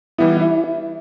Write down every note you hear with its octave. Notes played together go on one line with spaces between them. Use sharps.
E3 G3 B3 E4
E4